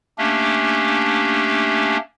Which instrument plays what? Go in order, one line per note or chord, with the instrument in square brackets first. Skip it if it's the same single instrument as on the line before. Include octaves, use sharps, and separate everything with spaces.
[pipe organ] A3 A#3 C#4 D4 G4